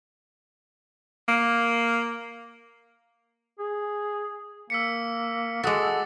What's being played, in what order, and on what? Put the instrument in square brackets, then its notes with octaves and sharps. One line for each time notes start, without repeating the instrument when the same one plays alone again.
[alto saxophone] A#3
[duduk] G#4
[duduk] A#3 [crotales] E6 B6 C#7
[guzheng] G#3 F#4 [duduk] A4 [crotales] D6 D#6 A6